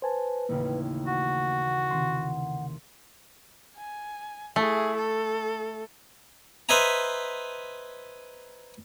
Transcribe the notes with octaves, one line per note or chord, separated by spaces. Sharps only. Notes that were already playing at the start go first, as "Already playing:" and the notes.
B4 C5 G#5 A5
A1 D#2 C#3 A#3
F#4 F#5
C3 D#3 C6
G#5
A3 E4 G#4
A4
B4 C5 D#5 E5 G#5 A#5